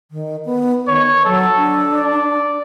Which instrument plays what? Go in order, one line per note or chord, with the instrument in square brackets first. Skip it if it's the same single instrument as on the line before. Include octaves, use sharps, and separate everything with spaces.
[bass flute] D#3
B3
[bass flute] D#3 [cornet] C#5
[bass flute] F#3 [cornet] A4
[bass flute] D4
[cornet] D5